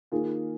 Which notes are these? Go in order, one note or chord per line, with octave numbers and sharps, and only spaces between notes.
D#3 A#3 F4 G#4